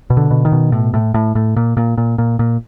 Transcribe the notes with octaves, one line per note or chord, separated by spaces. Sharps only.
B2
D3
B2
D#3
B2
A2
A2
A2
A2
A#2
A#2
A#2
A#2
A#2